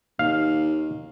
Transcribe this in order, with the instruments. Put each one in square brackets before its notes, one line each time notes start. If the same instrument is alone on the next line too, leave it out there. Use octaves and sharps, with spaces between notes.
[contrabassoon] D#2 [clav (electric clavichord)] F5